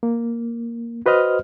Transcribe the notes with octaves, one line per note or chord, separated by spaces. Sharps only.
A#3
F#4 B4 C5 D#5 F6